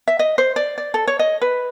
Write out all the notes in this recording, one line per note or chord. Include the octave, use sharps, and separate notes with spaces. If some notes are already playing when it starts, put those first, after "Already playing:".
E5
D#5
C5
D5
D5
A4
C#5
D#5
B4